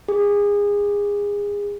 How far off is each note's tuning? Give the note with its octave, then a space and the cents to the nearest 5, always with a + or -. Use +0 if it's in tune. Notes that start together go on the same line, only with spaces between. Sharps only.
G#4 -25